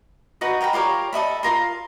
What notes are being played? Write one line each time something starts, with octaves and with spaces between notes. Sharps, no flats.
D#4 F#4 B4 D#5
A#4 G5 G#5 B5
F4 G4 A#4 C#5
A4 D#5 E5 B5
F4 A#4 C6